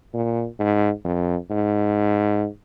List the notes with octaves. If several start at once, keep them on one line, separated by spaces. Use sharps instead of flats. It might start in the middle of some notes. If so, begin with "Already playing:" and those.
A#2
G#2
F2
G#2